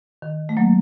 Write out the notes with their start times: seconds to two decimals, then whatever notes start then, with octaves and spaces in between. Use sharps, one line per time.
0.22 D#3
0.49 A3
0.57 F#3 A#3